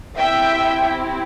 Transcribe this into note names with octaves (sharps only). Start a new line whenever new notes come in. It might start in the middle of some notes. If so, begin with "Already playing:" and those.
C4 E4 G4 E5 G5